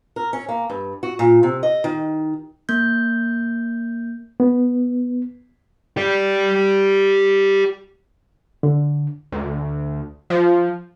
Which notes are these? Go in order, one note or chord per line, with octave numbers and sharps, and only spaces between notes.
A#4
C#4
A#3
G2
F#4
A#2
C3
D#5
D#3
A#3 G6
B3
G4 D5
D3
D2
F3